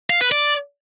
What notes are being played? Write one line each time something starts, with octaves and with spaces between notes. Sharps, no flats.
F5
B4
D5